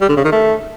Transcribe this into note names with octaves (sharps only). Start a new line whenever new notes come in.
G3
D3
C#3
D#3
A3